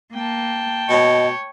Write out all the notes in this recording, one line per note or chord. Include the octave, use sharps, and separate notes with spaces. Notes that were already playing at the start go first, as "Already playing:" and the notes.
A#3 G5 A5
B2 C#5 D#5